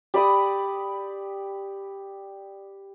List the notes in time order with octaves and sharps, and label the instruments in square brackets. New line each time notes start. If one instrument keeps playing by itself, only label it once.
[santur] G4 D5 B5 D#6